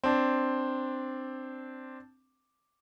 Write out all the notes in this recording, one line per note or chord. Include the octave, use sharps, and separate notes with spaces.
C4 D4